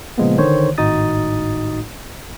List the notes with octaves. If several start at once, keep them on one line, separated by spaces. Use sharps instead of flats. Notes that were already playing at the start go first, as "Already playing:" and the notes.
A#2 C#3 F3 G#3 A#3 B3
D3 D#3 C5 C#5
G#1 A2 D#4 F#4 D#6 A6